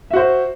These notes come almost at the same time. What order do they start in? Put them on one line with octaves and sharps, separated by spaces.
E5 F#4 C5